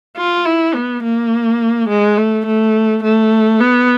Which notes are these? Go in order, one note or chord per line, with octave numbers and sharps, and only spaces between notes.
F4
E4
B3
A#3
G#3
A3
A3
A3
B3